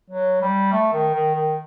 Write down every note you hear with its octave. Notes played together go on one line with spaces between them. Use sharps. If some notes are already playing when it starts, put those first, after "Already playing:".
F#3
G3
A3
D#3
D#3
D#3